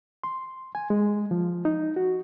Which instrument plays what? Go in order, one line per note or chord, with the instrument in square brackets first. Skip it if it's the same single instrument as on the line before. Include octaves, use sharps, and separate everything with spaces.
[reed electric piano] C6
G#5
G#3
F3
D#4
F#4